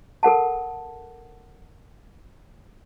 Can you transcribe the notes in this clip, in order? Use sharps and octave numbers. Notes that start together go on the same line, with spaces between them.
A4 A#4 F#5 A5